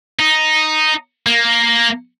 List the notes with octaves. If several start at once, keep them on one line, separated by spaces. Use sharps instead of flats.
D#4
A#3